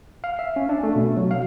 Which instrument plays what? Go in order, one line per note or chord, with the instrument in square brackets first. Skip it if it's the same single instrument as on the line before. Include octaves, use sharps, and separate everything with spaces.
[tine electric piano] F5
E5
C#4
D4
A3
B2
F#3
F5